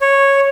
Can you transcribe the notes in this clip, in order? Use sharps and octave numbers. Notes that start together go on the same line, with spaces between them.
C#5